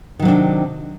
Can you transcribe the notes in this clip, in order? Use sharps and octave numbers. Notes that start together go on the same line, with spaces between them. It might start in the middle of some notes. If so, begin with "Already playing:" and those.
C3 D#3 F#3 D4